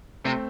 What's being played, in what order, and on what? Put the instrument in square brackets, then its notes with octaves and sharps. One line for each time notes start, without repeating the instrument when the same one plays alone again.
[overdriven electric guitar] C3 [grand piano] A3 C4